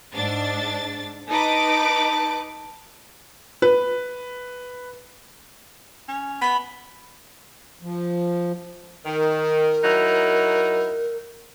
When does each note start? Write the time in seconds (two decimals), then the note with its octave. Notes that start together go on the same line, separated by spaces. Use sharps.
0.15 G#2 D4 A6
1.29 D#4 B4 A5 D6
3.62 B4
6.08 C#4
6.41 B3 B5
7.82 F3
9.05 D#3 A#4
9.83 F#3 D#4 E4